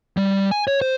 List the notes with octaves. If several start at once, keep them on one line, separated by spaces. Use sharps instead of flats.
G3
G#5
C#5
C5